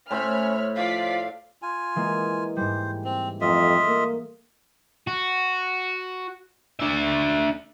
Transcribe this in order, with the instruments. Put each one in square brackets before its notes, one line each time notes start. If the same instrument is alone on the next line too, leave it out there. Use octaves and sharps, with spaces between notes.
[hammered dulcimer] A2 C5 E5 [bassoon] C#4 [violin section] C#5 B5 F6
[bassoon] F3 [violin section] F4 D5 B6 [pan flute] F5
[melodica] F4 G#5
[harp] E3 G#3 A#3
[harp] G#2 G3 [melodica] C5
[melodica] C4
[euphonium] F2 [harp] A3 [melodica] F4 D#5 E5
[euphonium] A#3
[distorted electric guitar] F#4
D4 E5